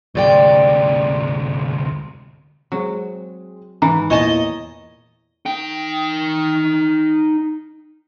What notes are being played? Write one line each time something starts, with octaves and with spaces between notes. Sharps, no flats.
D2 G#2 C3 D5 G5
F#3 G#3 C4
G#2 D#3 E3 A#5
E2 A#2 E3 C#5 D#5 G#5 A5
D#4 G5